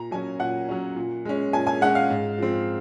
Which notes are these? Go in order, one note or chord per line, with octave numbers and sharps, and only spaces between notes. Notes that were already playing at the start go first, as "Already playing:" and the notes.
Already playing: A#2 A#5
F#3 C#4 G#5
A#2 F#5
F#3 C#4
A#2
G#3 C#4
A#2 G#5
G#5
G#3 C#4 F#5
F5
G#2
F3 C4